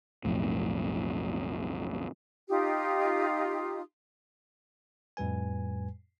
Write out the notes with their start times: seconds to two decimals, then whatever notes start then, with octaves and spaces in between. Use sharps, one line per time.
0.25 B1 F2 A2
2.48 D#4 F4 G4 D#6
5.17 F2 A2 G3 B4 G#5